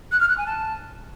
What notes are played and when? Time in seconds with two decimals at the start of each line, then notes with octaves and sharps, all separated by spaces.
0.11 F#6
0.20 F6
0.29 F#6
0.37 G#5
0.46 A5